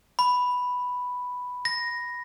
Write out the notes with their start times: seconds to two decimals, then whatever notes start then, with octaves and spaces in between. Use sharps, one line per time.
0.19 B5
1.65 A#6